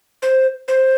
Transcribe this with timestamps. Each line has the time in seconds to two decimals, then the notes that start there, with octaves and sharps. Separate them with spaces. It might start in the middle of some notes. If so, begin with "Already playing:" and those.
0.22 C5
0.68 C5